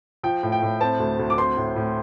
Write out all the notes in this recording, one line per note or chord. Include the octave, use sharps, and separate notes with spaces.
F3 G5
A2
G5
A2
C4 A5
D2
D2
D6
C4 C6
A2
A2